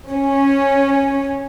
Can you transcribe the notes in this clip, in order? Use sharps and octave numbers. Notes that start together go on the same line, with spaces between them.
C#4